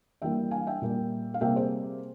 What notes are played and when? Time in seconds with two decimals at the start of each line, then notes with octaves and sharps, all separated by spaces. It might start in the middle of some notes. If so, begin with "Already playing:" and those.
0.22 E3 G3 A#3 E5 G5
0.51 F5 G#5
0.67 E5 G5
0.82 A#2 G3 A#3
1.34 F5
1.41 C3 G3 A#3 E5 G5
1.56 G#4 C5